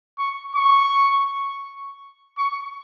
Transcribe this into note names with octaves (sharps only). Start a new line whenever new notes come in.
C#6
C#6
C#6